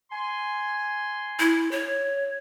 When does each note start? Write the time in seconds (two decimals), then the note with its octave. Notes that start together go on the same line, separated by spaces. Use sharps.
0.11 G#5 C6
1.39 E4
1.71 C#5